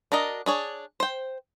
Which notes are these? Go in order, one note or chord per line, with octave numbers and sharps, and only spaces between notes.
D4 F#4 A#4 D#5
D4 G#4 C#5
C5 G5